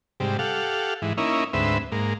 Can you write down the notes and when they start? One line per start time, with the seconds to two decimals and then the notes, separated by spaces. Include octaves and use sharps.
0.20 G#2 C3 G3
0.39 G4 A4 F5 F#5
1.02 G#2 E3
1.17 A#3 C#4 D#4 E4
1.53 D2 G#2 C4 B4 E5
1.92 G#2 A#3